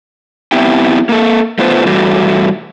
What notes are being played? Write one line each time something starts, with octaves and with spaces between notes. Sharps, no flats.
B3 C4 E4 G4 E5 G5
A#3 A4
A3 B3 F4 B4 C5
E2 G3 A3 F#4